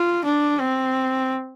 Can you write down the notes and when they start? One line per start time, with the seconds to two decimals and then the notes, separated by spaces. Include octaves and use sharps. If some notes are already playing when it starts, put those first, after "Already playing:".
Already playing: F4
0.25 D4
0.60 C4